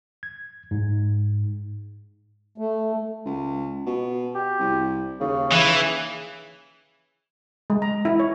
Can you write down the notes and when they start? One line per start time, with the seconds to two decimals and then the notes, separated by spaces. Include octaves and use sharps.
0.23 G#6
0.71 G#2
2.58 A3
3.26 C#2
3.86 B2
4.35 G4
4.59 C2
5.20 D#2 C#3
5.53 E3
7.70 G#3
7.82 A#5
8.05 E4
8.20 C#5